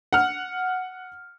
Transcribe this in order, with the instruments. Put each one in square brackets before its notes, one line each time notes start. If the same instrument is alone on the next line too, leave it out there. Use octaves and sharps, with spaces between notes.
[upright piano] F#5 F6